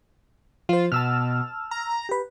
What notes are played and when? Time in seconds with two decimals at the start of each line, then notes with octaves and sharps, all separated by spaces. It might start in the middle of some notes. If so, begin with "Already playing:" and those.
0.69 F3 F4 C5
0.92 B2 A5 E6 F6
1.71 A#5
2.09 G4 B4